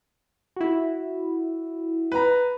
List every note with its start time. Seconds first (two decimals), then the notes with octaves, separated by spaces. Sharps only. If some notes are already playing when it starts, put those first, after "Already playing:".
0.56 E4 F#4
2.12 B4 A#5